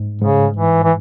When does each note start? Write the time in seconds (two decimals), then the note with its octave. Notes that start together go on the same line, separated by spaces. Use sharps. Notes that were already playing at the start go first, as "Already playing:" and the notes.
Already playing: G#2
0.22 G#2 C#3
0.57 E3
0.84 E3